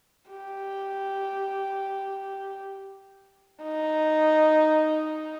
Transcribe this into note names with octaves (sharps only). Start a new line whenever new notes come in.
G4
D#4